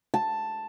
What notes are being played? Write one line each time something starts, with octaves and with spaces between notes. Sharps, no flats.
A5